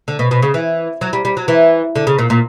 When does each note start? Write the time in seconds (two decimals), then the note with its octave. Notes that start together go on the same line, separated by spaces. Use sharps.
0.08 D3
0.19 B2
0.31 B2
0.42 C#3
0.54 E3
1.01 F#3
1.13 G3
1.25 G3
1.37 F#3
1.48 E3
1.96 D3
2.07 C#3
2.19 A#2
2.30 A#2